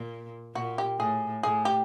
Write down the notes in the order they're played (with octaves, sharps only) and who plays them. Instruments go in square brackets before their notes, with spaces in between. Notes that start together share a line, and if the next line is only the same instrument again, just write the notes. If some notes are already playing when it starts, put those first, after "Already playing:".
Already playing: [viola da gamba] A#2
[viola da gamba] A#2 [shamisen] F#4
[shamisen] G4
[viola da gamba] A2 [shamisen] G#4
[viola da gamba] A2 [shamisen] G#4
[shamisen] G4